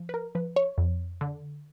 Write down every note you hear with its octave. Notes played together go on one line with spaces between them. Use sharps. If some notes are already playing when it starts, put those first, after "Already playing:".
Already playing: F3
B4
A#4
F3 B4
C#5
F2
D3